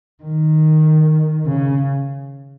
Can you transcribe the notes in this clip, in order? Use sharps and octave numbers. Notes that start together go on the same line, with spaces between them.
D#3
C#3